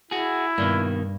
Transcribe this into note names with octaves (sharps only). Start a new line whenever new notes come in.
E4 F#4 G#4
G2 B2 D#3 A#3